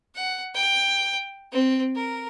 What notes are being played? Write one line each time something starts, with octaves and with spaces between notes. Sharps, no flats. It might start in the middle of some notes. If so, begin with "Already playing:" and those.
F#5
G5
C4
A#4